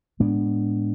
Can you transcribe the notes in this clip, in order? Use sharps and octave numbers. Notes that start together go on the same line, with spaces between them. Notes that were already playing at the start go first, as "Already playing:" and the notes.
A2 G#3 B3 D4